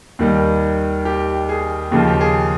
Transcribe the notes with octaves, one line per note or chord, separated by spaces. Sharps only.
D#2 D#3 G3
G4
G#4
D#2 C#3 F3 G4
G4
G#4